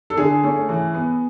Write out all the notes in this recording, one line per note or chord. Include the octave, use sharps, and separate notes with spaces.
A4
D3 G#4
A3 C#4
E3
B3